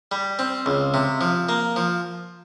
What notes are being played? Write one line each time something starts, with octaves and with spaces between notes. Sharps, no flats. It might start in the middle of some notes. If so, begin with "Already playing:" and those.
G3
C4
C#2
C3
F3
A#3
F3